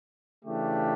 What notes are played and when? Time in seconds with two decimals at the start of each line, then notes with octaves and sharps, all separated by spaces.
0.45 C#3 E3 A3 D4 G4